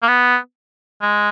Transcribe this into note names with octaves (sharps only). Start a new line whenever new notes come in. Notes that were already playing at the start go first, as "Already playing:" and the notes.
A#3
B3
G#3